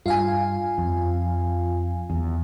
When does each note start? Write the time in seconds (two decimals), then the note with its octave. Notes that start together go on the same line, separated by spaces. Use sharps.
0.06 G2 F4 F5 G#5
0.78 F2
2.10 E2